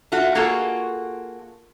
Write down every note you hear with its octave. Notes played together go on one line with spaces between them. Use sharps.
A3 F4 F#4
A#3 F4 F#4 G#4 A4